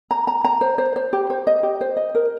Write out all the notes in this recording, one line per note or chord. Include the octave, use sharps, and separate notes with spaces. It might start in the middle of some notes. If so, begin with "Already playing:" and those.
A#5
A#5
A#5
C5
C5
C5
G4
C5
D#5
G4
C5
D#5
A#4